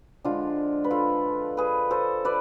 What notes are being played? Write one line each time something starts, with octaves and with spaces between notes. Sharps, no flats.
D3 F3 G#3 D4 F4
B4
F4 A4
G#4 B4
A4 C5
B4 D5